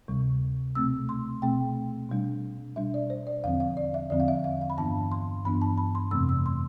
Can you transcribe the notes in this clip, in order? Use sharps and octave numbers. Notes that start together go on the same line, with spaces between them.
D2 C3 G3
B2 A3 C4 E6
C6
B2 A3 C4 G5
B2 G3 D4
B2 G3 D4 E5
D5
C5
D5
E2 D3 F3 C4 F5
F5
D5
E5
E2 D3 F3 C4 D5
F5
E5
F5
F5
B5
G2 E3 B3 D4 A5
C6
G2 E3 B3 D4 B5
A5
B5
C6
F2 C3 E3 A3 C4 E6
E6
C6